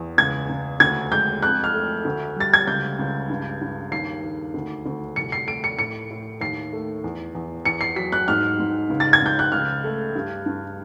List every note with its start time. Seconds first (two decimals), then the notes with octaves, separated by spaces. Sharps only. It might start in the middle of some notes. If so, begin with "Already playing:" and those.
Already playing: E2
0.18 C#2 G#6
0.49 C#2
0.80 D2 G#6
1.12 G#3 G6
1.43 F2 F#6
1.64 F6
1.74 A3
2.05 D2
2.36 G3 A6
2.53 G#6
2.67 C#2 G6
2.99 C#2
3.30 G2
3.61 G2
3.92 D#2 C7
4.24 D#2
4.54 D2
4.86 D2
5.16 C2 C#7
5.32 C7
5.48 A3 D7
5.64 C#7
5.78 A2 C#7
6.10 A2
6.41 D#2 C7
6.73 A3
7.04 E2
7.35 E2
7.65 E2 C#7
7.81 C7
7.96 F#3 B6
8.12 F#6
8.28 G#2 F6
8.60 G#2
8.90 C#2
9.00 A6
9.13 G#6
9.22 C#2 G6
9.39 F#6
9.52 C#2 F6
9.84 A3
10.15 G2
10.46 G2